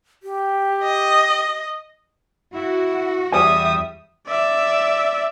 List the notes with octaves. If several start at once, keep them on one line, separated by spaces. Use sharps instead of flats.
G4
D#5
E4 F#4
E2 G3 C#5 E5 G#5 D#6
D5 E5